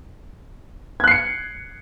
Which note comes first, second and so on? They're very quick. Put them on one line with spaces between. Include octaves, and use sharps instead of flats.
G#6 F#6 C7 C#7